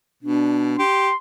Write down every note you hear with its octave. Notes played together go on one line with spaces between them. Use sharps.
B2 D4
G4 C6